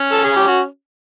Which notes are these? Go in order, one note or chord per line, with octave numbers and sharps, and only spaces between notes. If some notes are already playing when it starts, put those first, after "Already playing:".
Already playing: C#4
A4
G#4
G4
F#4